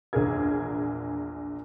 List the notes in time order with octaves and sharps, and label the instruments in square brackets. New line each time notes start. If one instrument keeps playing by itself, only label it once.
[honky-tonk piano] A#1 E2 G#4 A#4 G#6